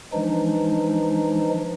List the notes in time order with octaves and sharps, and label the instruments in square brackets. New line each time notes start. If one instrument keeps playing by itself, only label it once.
[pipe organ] E3 F3 G#3 D4 D#4